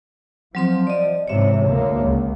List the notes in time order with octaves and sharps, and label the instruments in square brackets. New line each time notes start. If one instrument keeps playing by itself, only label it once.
[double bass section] F3 [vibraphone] F#3 C4 C6
[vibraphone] D5 D#5
[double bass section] G#2 C3 E3 [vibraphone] C#5 E5
[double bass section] D2 D3 A#3
C#2